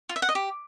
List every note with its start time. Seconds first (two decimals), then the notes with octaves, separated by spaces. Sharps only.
0.09 F4
0.16 E5
0.22 F#5
0.29 D#5
0.35 G4